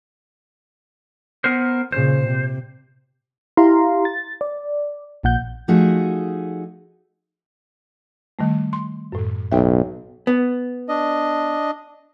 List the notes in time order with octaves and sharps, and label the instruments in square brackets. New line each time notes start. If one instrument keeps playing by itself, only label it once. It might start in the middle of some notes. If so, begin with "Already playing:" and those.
[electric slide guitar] B3 A#4 C5
[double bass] A#2 C#3 [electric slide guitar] C5
[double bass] C3
[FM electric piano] E4 G4 F5 A#5 C6
A6
D5
A#1 A#2 F#5 G6
[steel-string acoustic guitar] F3 A3 D#4 F#4 G#4
[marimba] D#3 G3 A3
C6
F#2 A2
[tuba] B1 [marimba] E5 G5
[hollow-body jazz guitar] B3
[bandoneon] D4 D#5